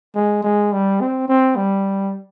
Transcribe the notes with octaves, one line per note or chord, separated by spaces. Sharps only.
G#3
G#3
G3
C4
C4
G3